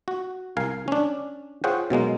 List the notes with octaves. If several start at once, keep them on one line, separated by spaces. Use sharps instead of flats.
F#4
C2 A#4 F5 G#5
C#4 D4
F4 G#4 C5 C#5 F#5 G5
B2 F#3 G#3 A#3